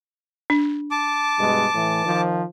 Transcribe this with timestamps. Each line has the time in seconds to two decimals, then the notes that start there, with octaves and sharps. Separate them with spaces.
0.50 D4
0.91 A5 D6
1.39 G2 B2 G#3
1.74 A2 E3
2.05 D#3 F3